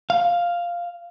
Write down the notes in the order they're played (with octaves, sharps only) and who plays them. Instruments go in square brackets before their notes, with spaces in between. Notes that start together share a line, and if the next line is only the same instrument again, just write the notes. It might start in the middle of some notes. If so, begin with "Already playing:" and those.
[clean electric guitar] F5